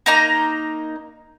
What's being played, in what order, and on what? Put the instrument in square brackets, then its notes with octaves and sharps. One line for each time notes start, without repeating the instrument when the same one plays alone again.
[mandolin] A#3 D#4 A#5